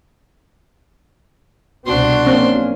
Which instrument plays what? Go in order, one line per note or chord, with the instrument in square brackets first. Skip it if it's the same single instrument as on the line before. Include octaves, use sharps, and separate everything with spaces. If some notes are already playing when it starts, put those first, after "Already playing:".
[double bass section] C2 B2 C4 [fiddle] D4 C6 [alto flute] F#4
[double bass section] F#3 A#3 C#4 [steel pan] C4